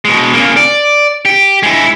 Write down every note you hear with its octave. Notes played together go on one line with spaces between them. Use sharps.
B2 G#3
C#3 A#3
D5
G4
G#3 E4